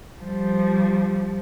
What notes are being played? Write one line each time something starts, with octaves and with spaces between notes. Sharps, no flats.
F3 G3